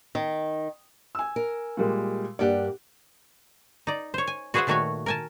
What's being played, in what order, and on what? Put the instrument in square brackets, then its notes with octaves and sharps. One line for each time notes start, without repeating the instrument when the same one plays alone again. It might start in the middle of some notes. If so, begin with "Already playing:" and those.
[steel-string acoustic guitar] D#3
[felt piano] G#5 E6
[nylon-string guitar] A#4
[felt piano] A#2 G3 G#3
[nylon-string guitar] G2 A#3 G4 [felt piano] D5 F#5
[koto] D#4 D5
C5 C#5
G#5
F#4 G#4 B4 C5 E5 F#5
A#2 D#3 A3 F#4 B4 C#5
A#4 G#5 A5